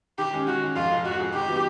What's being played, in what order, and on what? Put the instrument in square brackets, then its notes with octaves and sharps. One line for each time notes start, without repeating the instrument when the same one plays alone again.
[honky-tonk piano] D#3 [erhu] G4
[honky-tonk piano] G#3 C#4
[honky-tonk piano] D#3 [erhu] F#4
[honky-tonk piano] G#3 C#4
[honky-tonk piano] F2 [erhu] F4
[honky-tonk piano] C3 F3 G#3
[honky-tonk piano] F2 [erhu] F#4
[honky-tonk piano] C3 F3 G#3
[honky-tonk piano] D#3 [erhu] G4
[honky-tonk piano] F#3 B3 D#4